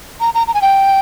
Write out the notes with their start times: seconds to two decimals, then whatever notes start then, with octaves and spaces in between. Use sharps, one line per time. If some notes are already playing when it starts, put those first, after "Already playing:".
0.20 A#5
0.34 A#5
0.47 A#5
0.54 G#5
0.62 G5